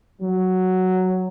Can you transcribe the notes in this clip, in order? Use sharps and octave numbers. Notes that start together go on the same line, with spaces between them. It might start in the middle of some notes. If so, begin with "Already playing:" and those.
F#3